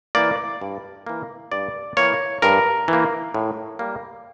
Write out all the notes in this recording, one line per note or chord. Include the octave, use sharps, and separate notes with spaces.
E3 A#3 D5
G2
E3 A#3
G2 D5
E3 A#3 C#5
G2 A#4
E3 A#3
A2
G3 A#3